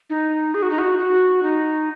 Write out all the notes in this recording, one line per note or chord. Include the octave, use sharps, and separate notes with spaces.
D#4
G#4
F#4
D#4
F#4
F#4
D#4